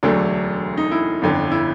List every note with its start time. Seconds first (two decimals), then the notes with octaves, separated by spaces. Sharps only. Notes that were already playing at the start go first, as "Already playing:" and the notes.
0.03 E1 D2 D3 F#3 A3 D4
0.77 D#4
0.91 E4
1.22 G1 F2 D3
1.51 E4